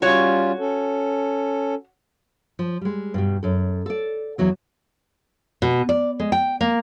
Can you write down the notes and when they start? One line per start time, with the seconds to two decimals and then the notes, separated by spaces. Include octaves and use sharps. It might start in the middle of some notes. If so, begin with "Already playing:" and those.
0.02 G3 C#4 F4 F#4 C#5
0.59 C#4 A4
2.59 F3
2.81 G3 G#3
3.14 G2 B2 G3
3.43 F#2 A4
3.86 A4 D5
4.38 E2 E3 F#3 B3
5.62 B2
5.89 D5
6.20 G#3
6.32 G5
6.61 A#3